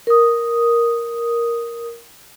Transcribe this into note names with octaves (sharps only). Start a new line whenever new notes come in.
A#4 D#6